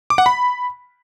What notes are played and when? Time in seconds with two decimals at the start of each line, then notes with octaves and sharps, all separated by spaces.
0.10 D6
0.18 F#5
0.26 B5